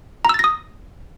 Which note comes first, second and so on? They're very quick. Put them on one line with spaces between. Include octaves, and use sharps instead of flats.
A#5 E6 A6 A#6 D#6